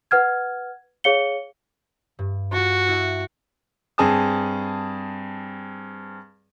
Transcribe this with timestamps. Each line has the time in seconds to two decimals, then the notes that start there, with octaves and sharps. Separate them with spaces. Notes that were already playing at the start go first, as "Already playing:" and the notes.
0.11 B4 F#5 F6 G#6
1.04 G#4 C#5 F5 C#7 G7
2.19 G2
2.53 F4 F#4 A4
2.88 E4
3.98 G2 C4 G#4 A5 D#6